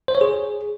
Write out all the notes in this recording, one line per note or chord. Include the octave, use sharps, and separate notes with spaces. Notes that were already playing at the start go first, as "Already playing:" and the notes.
C5
C#5
G#4